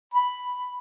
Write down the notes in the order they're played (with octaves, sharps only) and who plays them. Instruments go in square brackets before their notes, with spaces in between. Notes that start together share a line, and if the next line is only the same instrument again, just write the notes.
[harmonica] B5